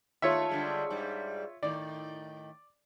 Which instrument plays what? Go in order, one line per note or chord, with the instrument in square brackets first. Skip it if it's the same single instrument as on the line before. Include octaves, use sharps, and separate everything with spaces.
[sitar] D#2 A3 [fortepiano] F4 C#5 E5
[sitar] D3 G3 G#3
G#2 G3
[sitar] A2 D#3 [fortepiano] D5